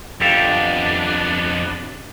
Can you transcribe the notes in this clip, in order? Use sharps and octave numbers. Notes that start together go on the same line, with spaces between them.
F2 B3 D4 G4 A4 F5